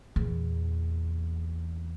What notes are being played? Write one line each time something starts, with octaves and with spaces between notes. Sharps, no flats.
E2 A#2